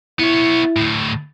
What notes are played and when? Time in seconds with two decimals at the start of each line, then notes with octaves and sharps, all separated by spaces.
0.19 B3 E4 C#5
0.77 D2 A2